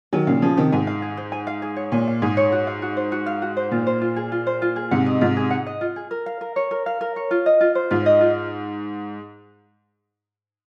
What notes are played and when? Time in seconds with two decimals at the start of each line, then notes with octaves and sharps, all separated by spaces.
0.13 D#3 F#3 G#5
0.27 A#2 C#3 F5
0.42 C#3 F3 G#4
0.57 C3 D#3 C5
0.72 G#2 G#5
0.87 F5
1.02 G#4
1.17 C5
1.32 G#5
1.47 F5
1.62 G#4
1.76 C#5
1.92 A#2 G#5
2.07 F5
2.22 G#2 G#4
2.37 C#5
2.52 F#4
2.67 F5
2.82 F#4
2.97 C5
3.12 F#4
3.26 F5
3.42 F#4
3.57 C5
3.71 A#2 F4
3.87 C5
4.01 F4
4.16 G#4
4.32 F4
4.47 C5
4.62 F4
4.76 G#4
4.91 G#2 C3 F#5
5.06 D#5
5.21 G#2 C3 F4
5.37 G#4
5.51 F#5
5.66 D#5
5.81 F4
5.96 G#4
6.11 A#4
6.26 F5
6.41 A#4
6.56 C#5
6.71 A#4
6.86 F5
7.01 A#4
7.16 C#5
7.31 F4
7.46 D#5
7.61 F4
7.75 C5
7.91 G#2 F4
8.06 D#5
8.21 F4